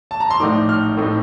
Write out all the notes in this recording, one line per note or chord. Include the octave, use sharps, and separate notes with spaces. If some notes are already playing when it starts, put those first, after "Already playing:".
A5
A#5
C6
A#1 A2 A3 D#4 D6
F6
A2 A3 C4 D#4